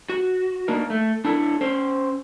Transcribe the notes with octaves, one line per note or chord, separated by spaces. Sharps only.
F#4
A#3 D4 D#4 A#4
A3
D4 E4 A4
C#4 C5